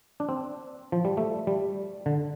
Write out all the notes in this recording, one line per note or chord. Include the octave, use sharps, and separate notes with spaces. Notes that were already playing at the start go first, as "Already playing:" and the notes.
D4
C4
F3
G3
A3
G3
D3